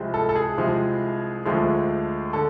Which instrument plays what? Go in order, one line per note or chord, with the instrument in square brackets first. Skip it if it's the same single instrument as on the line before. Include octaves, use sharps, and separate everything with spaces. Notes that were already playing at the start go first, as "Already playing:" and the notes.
Already playing: [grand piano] C2 C3 F3 G#3
A4
A4
G#4
C2 C3 F3 G#3
D2 D3 F3 G#3
D3 A4